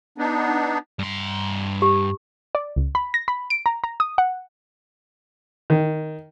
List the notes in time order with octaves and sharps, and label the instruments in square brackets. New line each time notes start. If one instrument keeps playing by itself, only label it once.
[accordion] B3 D4 D#4
[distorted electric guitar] G2 C6
[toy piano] G4
[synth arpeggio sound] D5
C#2
B5
A#6
B5
D7
A#5
A#5
D#6
F#5
[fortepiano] D#3